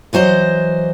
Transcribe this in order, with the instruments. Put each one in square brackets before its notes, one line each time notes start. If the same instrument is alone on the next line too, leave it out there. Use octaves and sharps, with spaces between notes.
[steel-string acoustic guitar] E3 F#3 C5 D#5